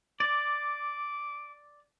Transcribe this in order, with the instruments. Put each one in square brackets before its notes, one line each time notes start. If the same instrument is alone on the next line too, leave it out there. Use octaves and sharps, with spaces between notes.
[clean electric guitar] D5 [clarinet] D6